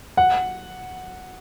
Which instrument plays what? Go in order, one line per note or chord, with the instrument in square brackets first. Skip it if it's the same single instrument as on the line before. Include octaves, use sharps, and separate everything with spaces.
[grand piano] F#5